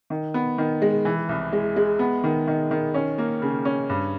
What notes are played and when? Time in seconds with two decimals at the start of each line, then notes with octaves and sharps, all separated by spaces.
0.10 D#3
0.34 B3
0.58 D#3
0.82 G#3
1.05 E3
1.29 C2
1.52 G#3
1.76 G#3
1.99 B3
2.24 D#3
2.47 D#3
2.71 D#3
2.94 C#4
3.18 A#3
3.42 C#3
3.65 C#4
3.89 G2